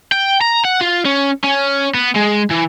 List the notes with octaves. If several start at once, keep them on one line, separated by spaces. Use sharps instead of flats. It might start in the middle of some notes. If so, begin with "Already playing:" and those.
G5
A#5
F#5
F4
C#4
C#4
B3
G#3
E3